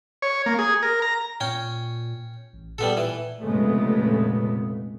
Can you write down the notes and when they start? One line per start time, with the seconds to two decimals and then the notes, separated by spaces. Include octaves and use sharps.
0.22 C#5
0.46 A#3
0.59 G#4
0.83 A#4
1.02 A#5
1.40 A#2 C#4 G5
2.53 A1
2.78 A#2 G3 B3 A4
2.97 E3
3.43 F1 A#2 C#3 G#3 A3 B3